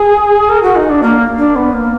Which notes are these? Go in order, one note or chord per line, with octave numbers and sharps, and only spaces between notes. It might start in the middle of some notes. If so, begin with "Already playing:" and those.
Already playing: G#4
A#4
F#4
D#4
D4
A#3
D4
B3
A#3